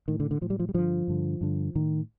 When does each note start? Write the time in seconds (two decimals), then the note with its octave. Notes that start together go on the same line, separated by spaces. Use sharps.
0.08 A2 D#3
0.20 D3
0.31 D3
0.41 A2 F3
0.50 G3
0.59 F3
0.69 G3
0.74 G2 D3 F3
1.08 G2 D3
1.41 G2 D3
1.75 A2 D#3